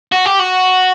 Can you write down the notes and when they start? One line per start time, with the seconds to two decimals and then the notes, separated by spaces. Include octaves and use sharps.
0.12 F#4
0.26 G4
0.40 F#4